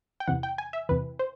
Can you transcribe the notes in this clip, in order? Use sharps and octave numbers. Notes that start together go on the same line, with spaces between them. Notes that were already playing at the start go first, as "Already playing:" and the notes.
G5
E2 C3 E3 F#5
G5
G#5
E5
E2 C3 E3 B4
C5